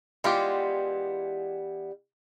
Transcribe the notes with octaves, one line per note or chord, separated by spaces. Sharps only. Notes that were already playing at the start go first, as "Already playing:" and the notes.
E3 G3 G#3 B3 F4 G4